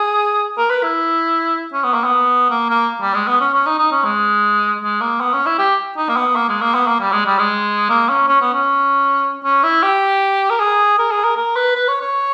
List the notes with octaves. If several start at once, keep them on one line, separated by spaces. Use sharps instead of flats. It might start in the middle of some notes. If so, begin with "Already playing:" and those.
Already playing: G#4
A#4
B4
E4
C#4
B3
A#3
B3
A#3
A#3
G3
G#3
B3
C#4
C#4
D#4
D#4
C#4
G#3
G#3
A#3
B3
C#4
E4
G4
D#4
A#3
B3
A#3
G#3
A#3
B3
A#3
G3
G#3
G3
G#3
A#3
C#4
C#4
B3
C#4
C#4
E4
G4
A#4
G#4
A#4
G#4
A#4
A#4
B4
B4
C#5
C#5